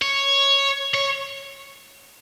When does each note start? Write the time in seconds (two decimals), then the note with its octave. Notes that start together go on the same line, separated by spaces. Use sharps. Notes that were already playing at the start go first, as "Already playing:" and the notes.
0.02 C#5
0.94 C#5